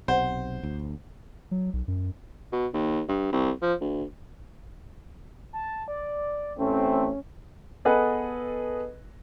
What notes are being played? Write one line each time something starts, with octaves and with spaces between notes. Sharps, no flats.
B1 C3 C5 F#5
D2
F#3
B1
F#2
B2
D#2
G2
C2
F3
D2
A5
D5
A1 A3 C4 C#4
B3 G#4 A4 B4 D#5 F#5